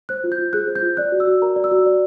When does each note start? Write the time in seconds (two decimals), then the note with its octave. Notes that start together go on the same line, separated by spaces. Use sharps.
0.09 C5 F#6
0.24 F4
0.32 G6
0.38 F4
0.53 G#4 F#6
0.68 C5
0.76 G6
0.82 F4
0.97 D5 F#6
1.12 F#4
1.20 E6
1.27 F#4
1.42 A#4 A#5
1.56 D5
1.64 E6
1.71 F#4
1.86 D5